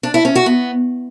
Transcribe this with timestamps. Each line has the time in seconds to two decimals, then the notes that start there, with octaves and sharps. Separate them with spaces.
0.03 D4
0.14 E4
0.25 C#4
0.35 F#4
0.46 B3